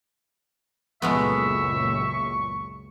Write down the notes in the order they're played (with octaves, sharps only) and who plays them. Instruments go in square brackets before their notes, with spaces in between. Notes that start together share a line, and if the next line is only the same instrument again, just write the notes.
[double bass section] C#2 F#2 A#2 [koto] G#3 A3 B3 [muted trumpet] E5 [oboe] C#6